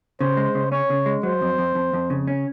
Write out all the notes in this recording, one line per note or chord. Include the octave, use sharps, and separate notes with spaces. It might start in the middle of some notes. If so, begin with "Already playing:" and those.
C#3 C5
G#3
C#3
C#4 C#5
C#3
G#3
F#3 C5
F2
F2
F2
F2
C#3
C#4